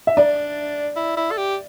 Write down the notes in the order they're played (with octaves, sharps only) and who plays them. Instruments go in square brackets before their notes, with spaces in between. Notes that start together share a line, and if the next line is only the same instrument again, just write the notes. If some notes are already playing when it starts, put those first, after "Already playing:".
[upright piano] E5
[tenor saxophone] D4 [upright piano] D5
[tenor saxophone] E4
E4
A4
G4